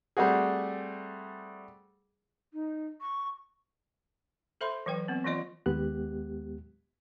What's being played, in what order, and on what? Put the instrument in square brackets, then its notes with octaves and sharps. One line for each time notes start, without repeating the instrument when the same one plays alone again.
[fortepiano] G3 A3 C4 F#4 G#4
[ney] D#4
C#6
[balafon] A4 C5 E5 B5 C6
E3 F#3 B4 G5
B3 C4
E3 F3 A#3 F4 D5 D#5
[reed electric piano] D#2 G#3 B3 G4 F#6